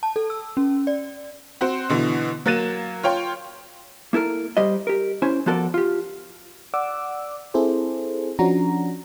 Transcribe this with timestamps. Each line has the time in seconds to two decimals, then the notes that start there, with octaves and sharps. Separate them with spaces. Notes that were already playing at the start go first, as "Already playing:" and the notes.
0.03 A5
0.16 A4
0.30 E6
0.57 C#4
0.87 D5
1.61 C4 F#4 C5
1.89 B2 D3 E3
2.46 F#3 A#3 F#6 A6 D#7 E7
3.03 F4 C#5 G5 C6
4.13 A#3 E4 A4 A#4
4.57 G3 G4 C5 D#5
4.87 G4 A#4
5.22 C#4 E4 C5 G#5
5.46 F3 B3 F#4 A4 A#4 D5
5.74 F4 G4
6.74 D5 F#5 D6 E6
7.54 C4 E4 G#4 A4 C5
8.39 F3 C#4 D4 F#4 A#5